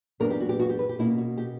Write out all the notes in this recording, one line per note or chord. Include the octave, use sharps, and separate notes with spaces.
F#2 E3 B3 D4 A#4
G4
F#4
G4
F#4
G4
B4
G4
B2 A#3 C#4 E4
F#4
G4